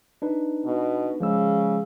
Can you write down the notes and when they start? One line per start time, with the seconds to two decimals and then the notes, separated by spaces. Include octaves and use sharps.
0.22 D4 D#4 B4
0.65 B2
1.21 C#3 F3 G#3 E6